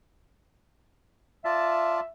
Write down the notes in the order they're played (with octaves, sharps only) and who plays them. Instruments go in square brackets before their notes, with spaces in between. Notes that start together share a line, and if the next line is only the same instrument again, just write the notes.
[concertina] F4 D5 A5 [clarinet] E5